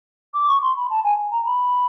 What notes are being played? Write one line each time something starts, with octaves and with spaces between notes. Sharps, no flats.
D6
C#6
C6
B5
A5
G#5
A#5
B5